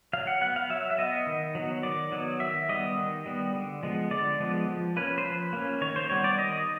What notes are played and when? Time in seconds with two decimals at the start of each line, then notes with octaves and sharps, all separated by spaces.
0.13 F#3 F5
0.27 F#5
0.41 B3 F#5
0.56 F5
0.70 F#3 E5
0.90 E5
0.98 B3 D#5
1.27 D#3
1.55 F#3 B3
1.83 D#3 D5
2.12 F#3 B3
2.40 D#3 E5
2.69 G3 B3 D#5
2.98 D#3
3.26 G3 B3
3.54 D3
3.83 F3 G#3 B3
4.11 D3 D5
4.40 F3 G#3 B3
4.69 F3
4.96 A#3 C#4 B4
5.18 C5
5.24 F3 B4
5.53 A#3 C#4
5.81 D#3 C#5
5.96 C5
6.10 G3 B3 C#5
6.24 D5
6.38 D#3 D#5